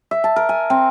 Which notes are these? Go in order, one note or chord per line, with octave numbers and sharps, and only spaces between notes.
E5
A5
A#4
G#5
C4